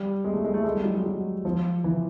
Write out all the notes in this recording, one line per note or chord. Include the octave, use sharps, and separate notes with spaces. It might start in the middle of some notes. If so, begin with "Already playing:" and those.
Already playing: G3
G#3
A3
G#3
A3
G#3
G3
F#3
G#3
F#3
F3
E3